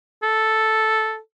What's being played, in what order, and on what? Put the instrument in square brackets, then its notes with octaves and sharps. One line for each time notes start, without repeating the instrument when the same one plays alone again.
[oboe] A4